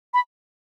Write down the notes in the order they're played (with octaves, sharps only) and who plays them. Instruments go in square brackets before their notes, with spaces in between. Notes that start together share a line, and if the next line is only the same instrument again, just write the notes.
[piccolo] B5